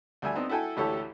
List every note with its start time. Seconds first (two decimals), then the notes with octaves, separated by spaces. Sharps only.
0.22 D2 G3 E5 G#5
0.35 B3 C4 D4 D#4
0.49 E4 F#4 A4 G5 G#5
0.77 A1 D2 E4 G4 A4 C#5